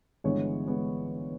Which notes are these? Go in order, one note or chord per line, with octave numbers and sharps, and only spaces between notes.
G1 G2 E3 G#3 B3 C#5
G#3 B3